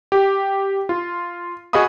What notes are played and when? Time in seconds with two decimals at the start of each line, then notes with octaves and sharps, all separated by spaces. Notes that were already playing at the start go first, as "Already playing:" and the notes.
0.12 G4
0.89 F4
1.73 F#4 G#4 D#5 F5 B5 D#6